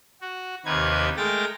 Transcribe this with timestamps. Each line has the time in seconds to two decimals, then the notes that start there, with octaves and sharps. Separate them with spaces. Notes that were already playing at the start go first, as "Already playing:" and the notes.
0.21 F#4
0.65 D#2 C3 D#3 D#4 B4 G#6
1.17 G#3 A3 A#4 G5 A6 A#6